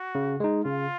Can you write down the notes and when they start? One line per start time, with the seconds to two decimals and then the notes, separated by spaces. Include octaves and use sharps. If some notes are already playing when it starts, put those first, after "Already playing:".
Already playing: F#4
0.15 C#3
0.40 G#3 D#4
0.65 C#3 F4